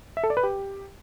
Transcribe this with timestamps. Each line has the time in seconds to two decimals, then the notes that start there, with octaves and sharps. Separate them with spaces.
0.17 E5
0.23 A4
0.30 D5
0.37 B4
0.43 G4